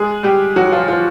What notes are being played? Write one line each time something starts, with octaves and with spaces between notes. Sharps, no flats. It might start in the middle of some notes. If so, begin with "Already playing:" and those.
Already playing: G#3 G#4
G3 G4
F#3 F#4
F3 F4
F3 F4